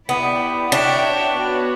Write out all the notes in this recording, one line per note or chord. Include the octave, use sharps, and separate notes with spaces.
B3 E4 G4 D5
D4 F#4 C#5 E5 G5
B3 F#4 C#5